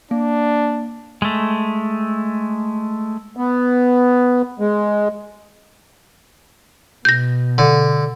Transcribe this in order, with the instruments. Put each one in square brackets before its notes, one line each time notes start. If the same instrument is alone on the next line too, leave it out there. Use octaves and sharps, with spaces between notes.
[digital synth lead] A#3 [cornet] D4
[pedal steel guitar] G#3 A3
[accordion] B3
G#3
[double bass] B2 [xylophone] G6 A#6
[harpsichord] D3